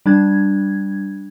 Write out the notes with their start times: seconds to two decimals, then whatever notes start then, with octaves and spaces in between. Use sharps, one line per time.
0.06 G3 D4 G#6